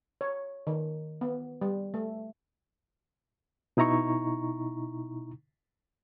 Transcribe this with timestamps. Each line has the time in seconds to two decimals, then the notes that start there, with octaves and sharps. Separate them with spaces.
0.21 C#5
0.67 D#3
1.21 B3
1.61 G3
1.94 A3
3.77 B2 D#4 E4 A#5 C#6